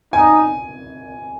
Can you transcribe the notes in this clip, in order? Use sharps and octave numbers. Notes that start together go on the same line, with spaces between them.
D#4 G#5